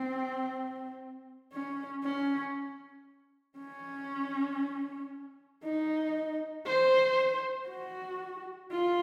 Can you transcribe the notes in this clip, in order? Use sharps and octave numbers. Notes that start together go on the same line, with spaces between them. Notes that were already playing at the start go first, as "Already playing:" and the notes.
Already playing: C4
C#4
C#4
C#4
D#4
C5
F#4
F4